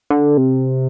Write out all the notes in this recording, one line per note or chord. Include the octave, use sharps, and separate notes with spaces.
D3
C3